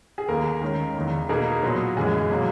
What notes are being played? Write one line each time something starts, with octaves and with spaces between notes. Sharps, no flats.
G#4
D#2 D#3 A#3 A#4
D#3 G#3 C#4
E2 D#3 A#3
B2 A#3 D#4 G#4 A#4
A#2 F#3 B3
F#2 E3 G#3 G#4
B2 F#3 A#3